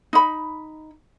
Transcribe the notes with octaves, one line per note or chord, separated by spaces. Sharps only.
D#4 B5